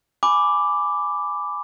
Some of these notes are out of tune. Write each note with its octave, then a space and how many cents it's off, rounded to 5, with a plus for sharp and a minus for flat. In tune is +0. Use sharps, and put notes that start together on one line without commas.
G#5 +0 B5 +10 D6 +0